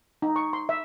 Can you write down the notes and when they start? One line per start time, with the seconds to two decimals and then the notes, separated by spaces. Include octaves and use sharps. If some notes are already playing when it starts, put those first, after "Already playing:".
0.22 D#4
0.36 C#6
0.53 C6
0.69 E5